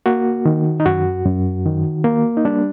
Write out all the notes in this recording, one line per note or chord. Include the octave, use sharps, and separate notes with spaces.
A#3 F#4
D#3
D#4
F#2 F#4
F#2
D#3
A#3
D#4
G3 D4